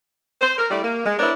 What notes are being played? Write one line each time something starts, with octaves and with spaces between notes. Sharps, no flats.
C5
A#4
G3 A3 E4 G4 D5
A#3
G#3
B3 D4 E4 A#4 C5 C#5